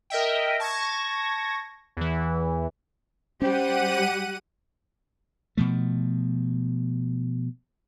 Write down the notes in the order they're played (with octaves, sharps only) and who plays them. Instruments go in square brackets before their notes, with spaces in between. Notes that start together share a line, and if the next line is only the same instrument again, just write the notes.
[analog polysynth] A#4 D#5 E5 G5
A5 C#6 G#6 A#6
E2 E3
[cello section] G3 G4 [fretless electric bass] C#4 [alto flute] C5 [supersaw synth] F#5 D#7
[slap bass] B2 F3 A3